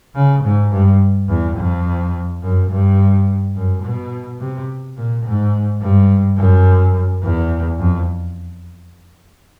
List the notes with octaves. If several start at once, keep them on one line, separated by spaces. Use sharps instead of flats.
C#3
G#2
G2
E2
F2
F#2
G2
F#2
B2
C3
A#2
G#2
G2
F#2
E2
F2